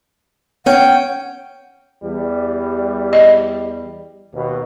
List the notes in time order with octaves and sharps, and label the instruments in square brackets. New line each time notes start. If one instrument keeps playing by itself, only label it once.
[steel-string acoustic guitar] C#4 G5 [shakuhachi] F#5
[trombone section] E2 G3
[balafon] D#5
[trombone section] D#2 B2